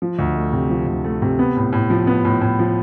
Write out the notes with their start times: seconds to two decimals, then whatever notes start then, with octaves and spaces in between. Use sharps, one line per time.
0.02 F3
0.19 D2
0.36 A3
0.53 C3
0.70 F3
0.87 D2
1.04 A3
1.22 C3
1.39 B3
1.57 A2
1.73 A2
1.90 F3
2.07 B3
2.25 A2
2.41 A2
2.59 F3